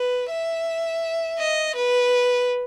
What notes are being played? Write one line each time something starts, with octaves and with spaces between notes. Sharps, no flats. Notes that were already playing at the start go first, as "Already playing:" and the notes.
Already playing: B4
E5
D#5
B4